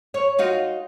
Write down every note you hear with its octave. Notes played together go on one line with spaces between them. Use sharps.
C#5
D#4 F4 F#4